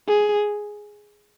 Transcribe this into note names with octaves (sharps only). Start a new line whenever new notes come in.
G#4